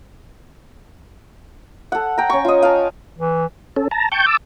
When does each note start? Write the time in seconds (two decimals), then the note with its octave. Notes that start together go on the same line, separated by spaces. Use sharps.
1.92 A4 F#5
2.18 G5 A#5
2.30 C#4 C#6
2.44 F4 D#5
2.62 F5 A5
3.18 E3
3.76 C#4 A4
3.91 A5 A#5
4.12 G5 A5 C#6 G6
4.26 A5 D6 E6